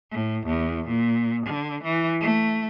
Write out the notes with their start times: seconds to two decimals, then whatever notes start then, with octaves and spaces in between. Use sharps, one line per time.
0.11 A2
0.46 E2
0.87 A#2
1.47 D3
1.83 E3
2.21 A3